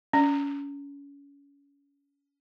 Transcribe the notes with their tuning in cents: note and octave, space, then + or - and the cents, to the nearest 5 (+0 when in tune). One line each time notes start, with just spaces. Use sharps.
C#4 +30